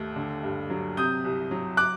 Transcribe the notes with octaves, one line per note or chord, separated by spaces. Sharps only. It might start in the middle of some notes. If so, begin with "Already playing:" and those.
Already playing: D#2 A3
D3
G2
F#3
C3 D#6 G6
C2
F#3
D6 F#6